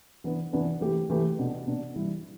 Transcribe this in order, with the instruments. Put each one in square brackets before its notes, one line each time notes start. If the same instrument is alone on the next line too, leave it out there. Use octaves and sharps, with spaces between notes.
[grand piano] E3 B3 D4 B4
E3 B3 D4 B4
E3 A3 G4 B4
E3 A3 G4 B4
B2 B3 D4
B2 B3 D4
E3 G3 E4